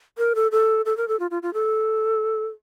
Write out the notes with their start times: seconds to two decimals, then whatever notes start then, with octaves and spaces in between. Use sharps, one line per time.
0.18 A#4
0.35 A4
0.52 A4
0.85 A4
0.97 A#4
1.08 A4
1.20 F4
1.31 F4
1.43 F4
1.54 A4